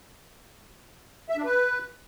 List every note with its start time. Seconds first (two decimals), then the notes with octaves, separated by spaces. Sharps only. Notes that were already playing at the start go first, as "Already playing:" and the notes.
1.30 E5
1.37 D4
1.45 B4